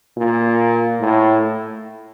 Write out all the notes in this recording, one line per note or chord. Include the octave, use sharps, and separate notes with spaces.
A#2
A2